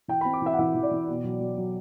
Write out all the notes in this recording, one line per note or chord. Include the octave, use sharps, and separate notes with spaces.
E3 G5
C4 B5
D6
E3 E5
F#5
E3 E5
E3
D5
E3
B2
F#3
F#3
F#3